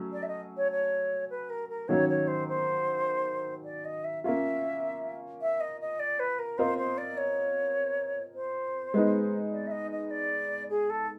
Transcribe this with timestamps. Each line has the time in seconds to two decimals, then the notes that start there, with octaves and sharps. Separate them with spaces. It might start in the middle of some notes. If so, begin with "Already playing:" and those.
Already playing: F#3 A3 C#4
0.13 D5
0.23 E5
0.28 D#5
0.57 C#5
0.72 C#5
1.30 B4
1.50 A#4
1.69 A#4
1.88 D#3 F#3 A#3 C#4 F#4 C#5
2.09 C#5
2.28 C5
2.48 C5
3.65 D5
3.85 D#5
4.04 E5
4.24 A#3 C#4 F4 E5
5.42 E5
5.61 D#5
5.81 D#5
6.00 D5
6.20 B4
6.39 A#4
6.58 C4 F4 A#4 C5 D#5
6.78 C5
6.98 D5
7.17 C#5
8.34 C5
8.94 G#3 B3 D#4
9.52 D5
9.67 E5
9.71 D#5
9.91 D#5
10.11 D5
10.70 G#4
10.90 A4